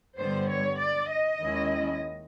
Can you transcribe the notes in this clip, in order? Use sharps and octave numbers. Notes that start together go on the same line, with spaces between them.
G2 D3 G3 B3 C5
C#5
D5
D#5
D#2 D#3 G#3 C#4 E4